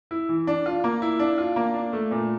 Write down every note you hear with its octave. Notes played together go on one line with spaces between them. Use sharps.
E4
E3
D4
F4
A#3
E4
D4
F4
A#3
D4
A3
A#2